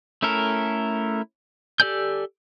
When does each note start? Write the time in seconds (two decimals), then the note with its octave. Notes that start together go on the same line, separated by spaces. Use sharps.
0.22 A3 C#4 E4 A4 A#4
1.80 G4 A4 D5 G#5 G6